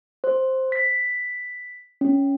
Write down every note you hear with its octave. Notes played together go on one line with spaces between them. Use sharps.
C5
B6
C#4